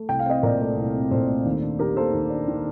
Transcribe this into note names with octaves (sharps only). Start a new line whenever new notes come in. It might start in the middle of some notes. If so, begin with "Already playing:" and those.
Already playing: A3
C2 G5
F5
C4 D#5 G5
A#2 A#4 D5
A3
C2
C4
A#2 A4 C5
A3
D#2
D4
D#3 G4 A#4
A#3 A4 C5
D#2
D4
D#3